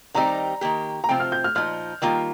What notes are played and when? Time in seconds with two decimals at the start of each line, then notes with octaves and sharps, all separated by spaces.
0.14 D#3 G3 C4 D#4 G4 A#5
0.61 D#3 A#3 G4
1.04 A#5
1.09 C3 F3 C4 F4 G5
1.20 F6
1.32 G6
1.44 F6
1.55 A#2 F3 D#4 F6
2.02 D#3 G3 A#3 F4